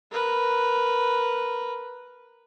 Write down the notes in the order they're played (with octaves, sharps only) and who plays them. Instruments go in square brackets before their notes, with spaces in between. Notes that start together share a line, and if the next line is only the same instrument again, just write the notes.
[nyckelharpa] A#4 B4